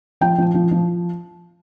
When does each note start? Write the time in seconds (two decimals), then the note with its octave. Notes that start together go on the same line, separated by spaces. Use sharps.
0.21 F3 G5
0.38 F3
0.54 F3
0.71 F3